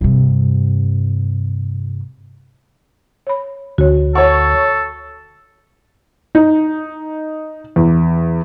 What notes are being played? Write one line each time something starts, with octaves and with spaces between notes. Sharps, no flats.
G2 C3
C#5 B5
D2 F#4 C#5
A4 C#5 F#5 C#6
D#4
E2